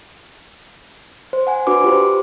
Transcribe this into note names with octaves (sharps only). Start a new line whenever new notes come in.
C5
F#5 G#5
D4 F#4 B4 D6
F4 G4 C5